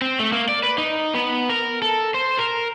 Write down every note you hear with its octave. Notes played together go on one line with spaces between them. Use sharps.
C4
A3
A#3
D5
B4
D#4
B3
A#4
A4
C5
A#4